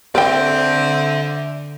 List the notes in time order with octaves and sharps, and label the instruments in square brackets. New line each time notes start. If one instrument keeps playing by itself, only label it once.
[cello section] D3 [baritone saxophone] C4 [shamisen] A#4 C5 G5 [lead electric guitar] D5 E5